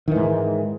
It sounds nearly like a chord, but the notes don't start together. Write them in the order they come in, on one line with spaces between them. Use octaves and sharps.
D#3 E3 G#2